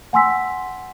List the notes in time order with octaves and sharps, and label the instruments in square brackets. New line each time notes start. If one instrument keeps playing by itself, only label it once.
[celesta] F#5 G#5 C6 E6 B6